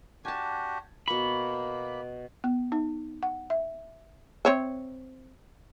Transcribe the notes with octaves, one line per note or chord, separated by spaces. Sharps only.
D4 F#4 G4 G#5 A5
B2 A#3 B5 C#6
B3
D#4
F#5
E5
C4 C#5 E5